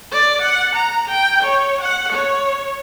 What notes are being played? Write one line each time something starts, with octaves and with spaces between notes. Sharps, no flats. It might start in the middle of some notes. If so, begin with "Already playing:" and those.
D5
F#5
A#5
G5
C#5
F#5
C#5